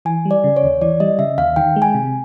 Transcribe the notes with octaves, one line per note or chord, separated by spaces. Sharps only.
E3 G#5
G3
D5
C#3
C#5
D#2
E3 D5
G3 D#5
C#3 E5
D#2 F5
D#3 G5
G#3
G#5
C3